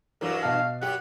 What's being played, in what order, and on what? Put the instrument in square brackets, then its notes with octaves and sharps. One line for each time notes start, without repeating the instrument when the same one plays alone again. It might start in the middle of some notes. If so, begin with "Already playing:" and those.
[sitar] G2 E3 F#3 [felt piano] A#4
[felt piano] B2 F#5 A5 [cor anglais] F5
[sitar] F#2 G4 [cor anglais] F#5